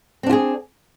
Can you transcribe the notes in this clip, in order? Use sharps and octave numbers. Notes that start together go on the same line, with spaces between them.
C4 D4 F4 G#4